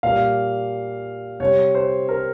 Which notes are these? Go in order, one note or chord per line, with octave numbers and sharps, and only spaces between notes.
A#2 G3 A#3 F5
C3 G3 C4 C#5
C5
A#4